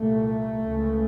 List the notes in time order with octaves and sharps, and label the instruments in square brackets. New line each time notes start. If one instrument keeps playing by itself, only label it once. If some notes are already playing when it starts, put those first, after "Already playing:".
Already playing: [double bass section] C2 A#2 A3
C#2 C#3